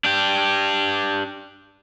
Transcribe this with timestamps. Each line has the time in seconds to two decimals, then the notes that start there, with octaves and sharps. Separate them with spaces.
0.05 D4 G4